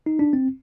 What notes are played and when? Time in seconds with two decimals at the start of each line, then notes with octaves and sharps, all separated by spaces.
0.06 D#4
0.19 D4
0.33 C4